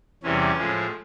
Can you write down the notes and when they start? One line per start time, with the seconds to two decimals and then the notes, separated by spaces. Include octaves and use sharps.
0.23 E2 C3 E3 G3 C#4
0.58 A2 F3 G#3